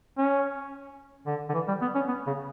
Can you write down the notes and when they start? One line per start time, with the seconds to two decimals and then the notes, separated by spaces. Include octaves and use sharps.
0.18 C#4
1.27 D3
1.49 D3
1.54 E3
1.68 G3
1.82 B3
1.95 C#4
2.08 B3
2.27 C#3